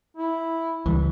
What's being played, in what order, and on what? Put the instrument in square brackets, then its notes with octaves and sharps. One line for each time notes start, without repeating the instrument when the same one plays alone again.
[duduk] E4
[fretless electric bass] C#2 G3 [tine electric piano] E3